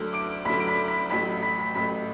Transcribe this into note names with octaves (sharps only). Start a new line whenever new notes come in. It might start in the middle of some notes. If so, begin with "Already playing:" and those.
Already playing: D2 D3 F#3
D6 D7
D2 D3 F#3 B5 B6
D7
B5 B6
B5 B6
A1 A2 F#3 B5 B6
B5 B6
B5 B6
A1 A2 F#3 B5 B6